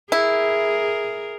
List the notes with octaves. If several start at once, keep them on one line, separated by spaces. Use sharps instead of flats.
E4 G#4 A#4